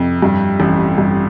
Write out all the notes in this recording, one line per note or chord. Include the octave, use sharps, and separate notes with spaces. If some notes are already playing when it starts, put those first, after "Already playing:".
Already playing: F2 C3
G2
A1
G2